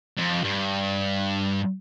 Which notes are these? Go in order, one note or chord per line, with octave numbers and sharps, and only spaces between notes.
F2
G2